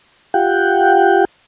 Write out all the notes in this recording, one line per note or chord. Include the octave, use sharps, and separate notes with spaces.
F4 G4 F#5 G5